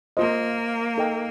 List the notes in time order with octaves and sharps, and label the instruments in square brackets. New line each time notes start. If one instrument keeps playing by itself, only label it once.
[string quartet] A#3 [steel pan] F4 C5 D#5
[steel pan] D#4 A4 D#5 G5